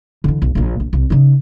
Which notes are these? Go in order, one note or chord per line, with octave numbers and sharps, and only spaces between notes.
D3 E3
B1
A#1 A#2
A#1
C2
C#3 D#4